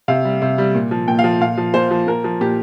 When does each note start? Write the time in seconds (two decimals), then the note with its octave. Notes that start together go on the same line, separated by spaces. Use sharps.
0.08 C3 F5
0.25 G3
0.42 C3
0.58 G3
0.74 A#2
0.91 F3
1.08 A#2 G5
1.19 F5
1.24 F3
1.41 A#2 F5
1.58 F3
1.74 A#2 C5
1.91 F3
2.07 A#2 A#4
2.24 F3
2.41 A#2 G4